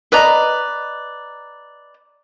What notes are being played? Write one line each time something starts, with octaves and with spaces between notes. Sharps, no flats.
B4 D5 D#5 A#5